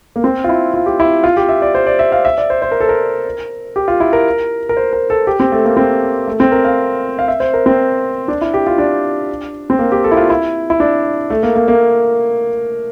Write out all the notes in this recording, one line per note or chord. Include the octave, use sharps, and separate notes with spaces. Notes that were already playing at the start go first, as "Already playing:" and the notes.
A#3
C4
F4
E4
F4
G4
E4
F4
G4
E5
D5
C5
D5
E5
F5
E5
D5
C5
C5
A#4
A4
A#4
G4
F4
E4
A#4
A#4
C5
A#4
A4
G4
C4
A3
A#3
C4
A3
C4
A#4
F5
F5
E5
C5
A#4
C4
D4
E4
G4
F4
D4
C4
A#3
G4
A4
E4
F4
E4
E4
D4
A3
A#3
A#3
A#3